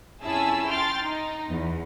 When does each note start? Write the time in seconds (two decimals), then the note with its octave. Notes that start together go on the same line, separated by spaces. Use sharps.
0.23 F2 C#4 E4 G#4 A5 E6
0.68 G5 C6 F6 A6
1.02 D#4
1.49 E2